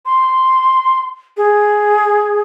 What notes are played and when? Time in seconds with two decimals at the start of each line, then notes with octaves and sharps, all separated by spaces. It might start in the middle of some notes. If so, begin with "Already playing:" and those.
0.06 C6
1.37 G#4